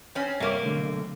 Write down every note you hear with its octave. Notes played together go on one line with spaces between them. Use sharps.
C4 C#4
G2 C3 A#3 C#5
B1 D3 A3